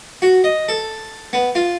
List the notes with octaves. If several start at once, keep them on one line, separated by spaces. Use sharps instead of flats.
F#4
D#5
A4
B3
F4